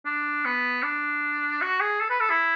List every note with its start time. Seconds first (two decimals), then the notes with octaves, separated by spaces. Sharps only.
0.06 D4
0.45 B3
0.83 D4
1.62 F#4
1.81 G#4
2.00 A4
2.10 B4
2.20 A4
2.30 E4